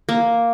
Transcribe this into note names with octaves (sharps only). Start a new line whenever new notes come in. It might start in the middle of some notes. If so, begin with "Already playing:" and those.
A#3